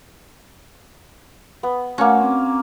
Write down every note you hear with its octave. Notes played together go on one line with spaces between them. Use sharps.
B3
A3 A#3 C#4 F#4
C4 D6